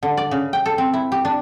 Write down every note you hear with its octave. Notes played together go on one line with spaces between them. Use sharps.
D3
D5
C#3
G5
A4
C4
E4
G4
D4